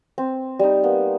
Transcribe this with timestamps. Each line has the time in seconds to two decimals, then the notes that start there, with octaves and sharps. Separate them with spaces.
0.18 C4
0.59 G3 D#4
0.84 A#3 B3